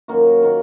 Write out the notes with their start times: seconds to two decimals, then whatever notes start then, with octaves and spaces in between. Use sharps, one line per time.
0.08 F#2 D#3 A#3 F#4
0.43 D#3 A#3 F#4